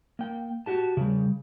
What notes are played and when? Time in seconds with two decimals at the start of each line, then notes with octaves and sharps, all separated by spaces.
0.19 A#3 G5
0.66 F#4 G4 A5
0.97 C#3 G3